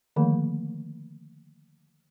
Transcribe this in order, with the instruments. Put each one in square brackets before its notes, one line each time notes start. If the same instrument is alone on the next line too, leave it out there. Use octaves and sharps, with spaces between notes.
[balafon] D3 D#3 F3 A3 A#3